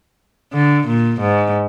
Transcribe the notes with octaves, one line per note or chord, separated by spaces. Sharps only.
D3
A#2
G#2